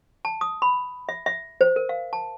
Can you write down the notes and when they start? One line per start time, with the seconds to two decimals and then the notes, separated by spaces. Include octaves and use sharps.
0.25 A5
0.41 D#6
0.62 B5
1.09 E5
1.26 E5
1.61 C5
1.76 A#4
1.89 F5
2.13 A5